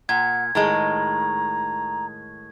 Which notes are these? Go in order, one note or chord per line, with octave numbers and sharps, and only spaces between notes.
A#2 F#5 G#6
A2 D#3 G#3 A#5